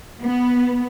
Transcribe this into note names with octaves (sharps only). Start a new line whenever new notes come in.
B3